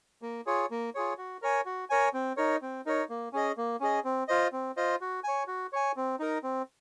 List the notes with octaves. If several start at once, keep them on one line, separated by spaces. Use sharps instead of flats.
A#3
F4 G#4 C#5
A#3
F4 G#4 C#5
F#4
A#4 C#5 G#5
F#4
A#4 C#5 G#5
C4
D#4 A#4 C#5
C4
D#4 A#4 C#5
A#3
C#4 G#4 D#5
A#3
C#4 G#4 D#5
C4
F4 C5 D#5
C4
F4 C5 D#5
F#4
C#5 G#5
F#4
C#5 G#5
C4
D#4 A#4
C4